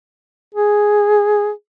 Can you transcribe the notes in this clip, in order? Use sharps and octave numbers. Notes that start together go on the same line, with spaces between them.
G#4